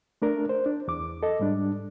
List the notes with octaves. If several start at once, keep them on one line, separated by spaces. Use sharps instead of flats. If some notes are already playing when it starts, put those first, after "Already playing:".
A3 D4 A#4
C5
D4
E2 D6
A4 D#5
G#2 G3 D4